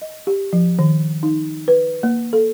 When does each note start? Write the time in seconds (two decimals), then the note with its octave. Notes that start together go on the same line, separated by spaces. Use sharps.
0.02 D#5
0.27 G4
0.53 F3
0.79 D#3
1.23 D#4
1.68 B4
2.03 A#3
2.33 A4